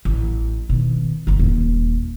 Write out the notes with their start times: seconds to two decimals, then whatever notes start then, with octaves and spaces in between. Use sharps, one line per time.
0.05 A1
0.69 B2 D#3
1.27 G#1 F3
1.39 D#1 D#4